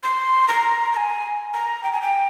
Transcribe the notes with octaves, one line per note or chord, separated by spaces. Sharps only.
C6
A#5
A#5
G#5
A#5
G5
G#5
G5